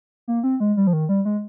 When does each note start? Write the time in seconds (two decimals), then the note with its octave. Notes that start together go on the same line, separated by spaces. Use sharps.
0.28 A#3
0.43 C4
0.60 G#3
0.77 G3
0.87 F3
0.93 D#3
1.09 G3
1.25 G#3